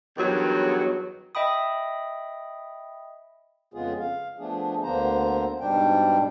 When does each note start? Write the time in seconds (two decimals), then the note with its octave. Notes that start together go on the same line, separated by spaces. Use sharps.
0.17 E2 G2 D#3 F#3
1.35 D#5 E5 G5 B5 D#6
3.74 F2 C#3 G#3 B3 F4 G#4
4.00 F5
4.39 F3 A3 B3 D4 G#4
4.83 D2 D3 A#3 B3 C5 A#5
5.60 G#2 B2 G3 D4 G5